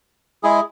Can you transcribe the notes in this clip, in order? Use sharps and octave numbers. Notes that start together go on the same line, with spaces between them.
G#3 E4 G#4